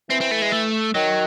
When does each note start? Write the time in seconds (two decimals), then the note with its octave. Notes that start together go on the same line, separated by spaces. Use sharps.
0.10 E3 C4
0.21 C4
0.31 A3
0.42 G#3
0.52 A3
0.94 D#3 F#3